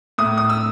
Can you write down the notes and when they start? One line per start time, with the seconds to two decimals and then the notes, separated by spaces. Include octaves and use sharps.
0.18 A2 D#6
0.38 D#6
0.49 E6